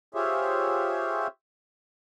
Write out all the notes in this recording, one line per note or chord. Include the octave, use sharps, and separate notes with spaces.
F4 G4 G#4 C5 C#5 E5